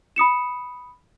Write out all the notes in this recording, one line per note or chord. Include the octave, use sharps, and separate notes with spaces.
B5 D#6 C#7 E7